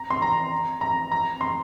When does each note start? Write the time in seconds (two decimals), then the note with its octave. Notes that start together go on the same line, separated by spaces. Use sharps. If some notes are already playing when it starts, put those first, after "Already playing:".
Already playing: A#5
0.10 C6
0.22 A#5
0.81 A#5
1.11 A#5
1.41 C6